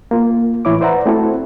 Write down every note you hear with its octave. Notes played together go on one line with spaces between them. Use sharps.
A#3 F4
A2 E3 E4 C#5 D6
B4 C5 D5 E5 F#5 A#5
A3 C4 E4 F#4 A4